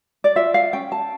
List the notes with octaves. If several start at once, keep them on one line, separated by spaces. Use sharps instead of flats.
D5
F4 E5
F5
C#4 G5
A5